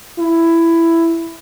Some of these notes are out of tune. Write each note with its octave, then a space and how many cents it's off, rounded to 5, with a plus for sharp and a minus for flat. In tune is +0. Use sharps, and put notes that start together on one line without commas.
E4 +10